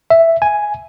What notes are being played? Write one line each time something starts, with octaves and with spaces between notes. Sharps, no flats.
E5
G#5